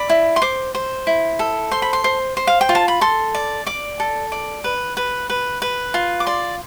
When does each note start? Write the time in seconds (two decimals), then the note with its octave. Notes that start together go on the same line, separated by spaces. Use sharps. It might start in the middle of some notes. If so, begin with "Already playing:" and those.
Already playing: D5 B5
0.09 E4
0.36 C6
0.42 C5 D6
0.75 C5
1.07 E4
1.39 A4
1.71 C5 C6
1.82 B5
1.93 C6
2.04 C5
2.37 C5
2.47 F5
2.61 G5
2.69 F4
2.75 A5
2.88 B5
3.01 A4 C6
3.34 D5
3.66 D5 D6
4.00 A4
4.32 D5
4.64 B4
4.97 B4
5.30 B4
5.62 B4
5.94 F4
6.20 D6
6.26 D5 C6